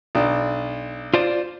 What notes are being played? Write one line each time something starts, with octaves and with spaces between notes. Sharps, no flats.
B1 D4
F4 C5 D5